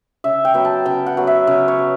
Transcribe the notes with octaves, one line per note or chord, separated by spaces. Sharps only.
C#3 E5
G5
F#3 B3
A5
C#3 G5
F#5
F#3 B3
E5
C#3
C#5
F#3